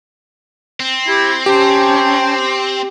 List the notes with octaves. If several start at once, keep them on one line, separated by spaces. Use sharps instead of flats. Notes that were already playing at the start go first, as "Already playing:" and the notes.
C4
E4 G4
C#4 G4 C5 G5 A5